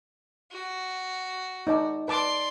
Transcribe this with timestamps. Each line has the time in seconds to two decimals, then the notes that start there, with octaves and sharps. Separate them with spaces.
0.52 F#4
1.67 D#4 D5 A5
2.08 B4 D5 A5 C6 D6